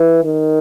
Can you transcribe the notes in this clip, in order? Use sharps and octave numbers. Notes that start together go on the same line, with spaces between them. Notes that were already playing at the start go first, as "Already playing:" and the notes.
Already playing: E3
D#3